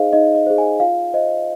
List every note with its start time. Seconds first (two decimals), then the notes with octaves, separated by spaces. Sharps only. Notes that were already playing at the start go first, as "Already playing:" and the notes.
Already playing: D#4 G#4 C5 D#5 F5
0.13 D#4 D#5
0.35 D#5
0.47 G#4 C5
0.58 G#5
0.80 F4 F5
1.14 C5 D#5